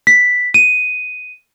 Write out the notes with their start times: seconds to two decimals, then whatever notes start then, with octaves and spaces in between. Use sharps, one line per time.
0.07 B6
0.54 D#7